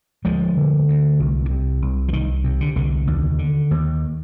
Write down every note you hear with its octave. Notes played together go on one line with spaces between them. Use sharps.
D2 F3 G#3
D3
D2
C2
C3
C2
F3
C2 D#3
C3
D3
C2 D3
D#2
D3
D#2